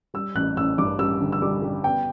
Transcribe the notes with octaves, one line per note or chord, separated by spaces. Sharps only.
G3 E6
A1 F#6
A1 E6
G2 D6
G3 E6
D3
E6
G3 D6
G3
B3 G5